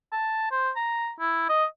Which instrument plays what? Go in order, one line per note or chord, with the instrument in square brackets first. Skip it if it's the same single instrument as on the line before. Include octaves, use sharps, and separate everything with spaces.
[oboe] A5
C5
A#5
E4
D#5